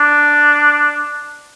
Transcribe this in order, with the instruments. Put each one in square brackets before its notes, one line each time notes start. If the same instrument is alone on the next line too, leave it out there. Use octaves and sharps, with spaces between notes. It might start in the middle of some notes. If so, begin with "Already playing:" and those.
Already playing: [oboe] D4